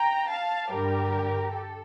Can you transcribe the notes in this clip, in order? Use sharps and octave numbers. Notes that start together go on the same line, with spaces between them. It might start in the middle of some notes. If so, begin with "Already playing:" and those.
Already playing: G5 A#5
F5 A5
G2 D3 G3 G4 A#4
A4